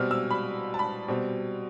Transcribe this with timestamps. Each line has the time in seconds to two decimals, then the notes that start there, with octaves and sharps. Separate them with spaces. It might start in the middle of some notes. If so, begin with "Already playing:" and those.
Already playing: B2 G3 C4 F6
0.11 E6
0.31 B5
0.74 A5
0.79 B5
1.08 B2 G3 C4